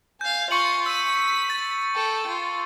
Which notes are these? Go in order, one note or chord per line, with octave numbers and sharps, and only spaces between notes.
F5 G#5 G6
F4 C#6 C#7 D#7 F#7
E6 B6 D#7
A6
A4 G5
F4